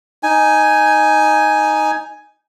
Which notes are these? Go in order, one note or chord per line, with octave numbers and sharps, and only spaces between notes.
D#4 G#5